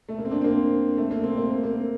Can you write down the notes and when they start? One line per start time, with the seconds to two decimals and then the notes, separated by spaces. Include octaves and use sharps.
0.09 A3
0.19 A#3
0.25 C4
0.31 D4
0.41 C4
0.44 A#3
0.97 A3
1.11 A#3
1.24 C4
1.37 A#3
1.50 C4
1.63 A#3